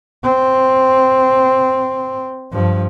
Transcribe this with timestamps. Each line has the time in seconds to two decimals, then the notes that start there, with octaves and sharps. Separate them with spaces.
0.23 C4
2.52 G2 F3